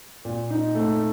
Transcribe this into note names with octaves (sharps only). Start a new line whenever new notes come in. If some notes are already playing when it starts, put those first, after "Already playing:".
A#2
D#4
A3